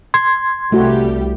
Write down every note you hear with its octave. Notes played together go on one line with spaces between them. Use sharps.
C6 G#6
C2 G3 A3 F#4 G4